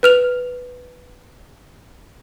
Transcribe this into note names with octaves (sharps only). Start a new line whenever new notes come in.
B4 F6 F7